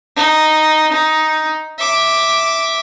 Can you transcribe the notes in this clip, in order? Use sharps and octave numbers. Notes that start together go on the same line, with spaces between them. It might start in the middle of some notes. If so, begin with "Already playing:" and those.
D#4
D#4
E5 D6